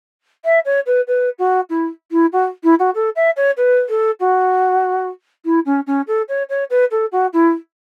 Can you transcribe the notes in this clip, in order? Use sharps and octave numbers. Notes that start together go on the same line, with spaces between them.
E5
C#5
B4
B4
F#4
E4
E4
F#4
E4
F#4
A4
E5
C#5
B4
A4
F#4
E4
C#4
C#4
A4
C#5
C#5
B4
A4
F#4
E4